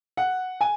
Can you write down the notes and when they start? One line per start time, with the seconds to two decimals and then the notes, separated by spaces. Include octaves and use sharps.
0.17 F#5
0.61 G#5